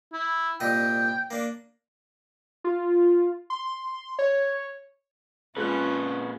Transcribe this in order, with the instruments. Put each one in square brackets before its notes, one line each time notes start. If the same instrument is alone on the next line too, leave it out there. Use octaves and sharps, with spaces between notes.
[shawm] E4
[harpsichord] C2 A#2 D#5 [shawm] G5
[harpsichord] A#3 D4
[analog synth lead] F4
C6
C#5
[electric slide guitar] A#2 B4 [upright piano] G#3 F#6 [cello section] C#4 F4